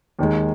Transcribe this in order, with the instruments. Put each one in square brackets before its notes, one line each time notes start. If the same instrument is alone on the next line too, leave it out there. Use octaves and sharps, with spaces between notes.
[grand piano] D#2 D#3 G#3